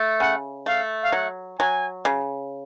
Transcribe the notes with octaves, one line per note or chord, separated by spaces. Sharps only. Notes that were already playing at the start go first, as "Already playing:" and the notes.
Already playing: A3
C#3 F#5
A3 F5
F5
F#3 F#5
F#3 G#5
C#3